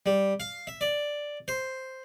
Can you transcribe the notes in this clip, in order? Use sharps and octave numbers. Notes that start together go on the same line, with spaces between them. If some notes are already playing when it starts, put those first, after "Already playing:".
G3
F5
E5
D5
C5